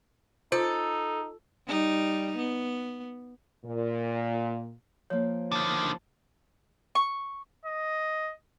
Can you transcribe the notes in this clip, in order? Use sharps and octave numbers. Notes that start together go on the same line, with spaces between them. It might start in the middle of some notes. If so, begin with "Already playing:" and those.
D#4 F4 A4 C5
G3 D#4
B3
A#2
F3 A#3 C#5
D3 D#3 A5
C#6
D#5